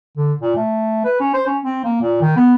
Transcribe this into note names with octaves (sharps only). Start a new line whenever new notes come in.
D3
A#2
A3
B4
C#4
C5
C#4
C4
A#3
A#2
D#3
B3